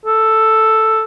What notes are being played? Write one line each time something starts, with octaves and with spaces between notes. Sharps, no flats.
A4